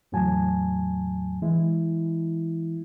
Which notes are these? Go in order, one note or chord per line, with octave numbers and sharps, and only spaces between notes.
E2 A2 C#3 F#3 G#5 A5
E3 G#3 E4